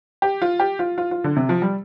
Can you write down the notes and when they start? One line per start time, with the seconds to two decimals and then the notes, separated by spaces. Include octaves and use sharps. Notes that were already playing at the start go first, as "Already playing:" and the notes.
0.22 G4
0.42 F4
0.60 G4
0.79 F4
0.98 F4
1.11 F4
1.24 D3
1.36 C3
1.49 F3
1.62 G3